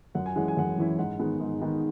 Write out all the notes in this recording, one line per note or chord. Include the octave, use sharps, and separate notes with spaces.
F#2 F#5
G#5
E3 G#3 C#4 E4 F#5
G#5
F#2 F#5
E3 G#3 C#4 E4
G#2 F#5
D#3 G#3 B3 D#4
G#2
D#3 G#3 B3 D#4